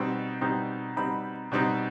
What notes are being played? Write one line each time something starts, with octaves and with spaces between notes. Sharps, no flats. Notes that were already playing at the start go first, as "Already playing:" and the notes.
Already playing: B2 G3 C4 D#4
B2 G3 C4 D#4
B2 G3 C4 D#4 B5
B2 G3 C4 D#4